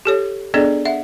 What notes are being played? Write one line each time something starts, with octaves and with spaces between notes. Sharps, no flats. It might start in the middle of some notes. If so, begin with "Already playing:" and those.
G4 A4 C#5
B3 D4 G#4 A4 D5 D#5
E5 F#5